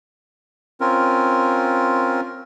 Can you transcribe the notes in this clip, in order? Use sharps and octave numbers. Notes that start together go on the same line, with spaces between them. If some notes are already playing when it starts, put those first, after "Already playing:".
C4 C#4 F4 A#4